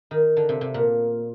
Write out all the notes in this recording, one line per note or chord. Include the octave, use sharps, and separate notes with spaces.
D#3
D3
C3
C3
A#2